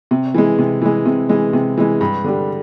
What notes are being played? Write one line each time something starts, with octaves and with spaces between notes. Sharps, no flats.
C3
E3 G#3
C3
E3 G#3
C3
E3 G#3
C3
E3 G#3
G2
D3 G3